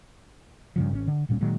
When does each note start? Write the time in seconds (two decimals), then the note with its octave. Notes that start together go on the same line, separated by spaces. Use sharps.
0.76 G2 C#3 F3
0.91 G#1 D3 C#4
1.07 D3
1.29 D1 A#2 G3 C#4
1.41 A#2 D#3 F#3 G#3